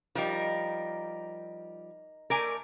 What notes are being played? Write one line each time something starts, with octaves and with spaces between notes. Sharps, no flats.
F3 G3 D#4 A#4
A3 A#4 D5 G#5